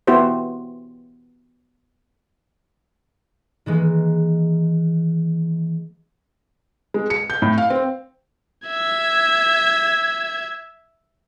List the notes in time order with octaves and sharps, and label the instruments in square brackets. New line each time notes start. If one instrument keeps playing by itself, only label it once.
[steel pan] B3 E4 F#4 G4 C5
[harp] D#3 E3 G#3 A#3
[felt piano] G#3
C#7
G6
A2
F5
C4
[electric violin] E5 G#6